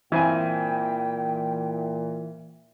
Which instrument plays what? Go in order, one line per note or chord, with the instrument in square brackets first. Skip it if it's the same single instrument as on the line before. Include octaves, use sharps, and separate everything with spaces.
[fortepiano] G2 C4 G#5 [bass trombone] A#2 [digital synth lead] E3 [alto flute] G5